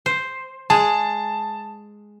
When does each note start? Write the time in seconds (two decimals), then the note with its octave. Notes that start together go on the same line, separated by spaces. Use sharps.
0.06 C5
0.70 G#3 G#4 A5